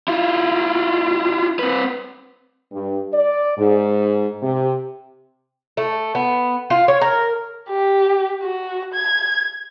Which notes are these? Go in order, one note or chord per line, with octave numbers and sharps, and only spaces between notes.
E4 F4
C4 B4
G2
D5
G#2
C3
A3
B3
F4
C#5
A#4
G4
F#4
G#6